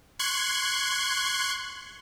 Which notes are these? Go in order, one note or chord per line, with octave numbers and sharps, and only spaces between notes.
C6 C#6 F#6 G#6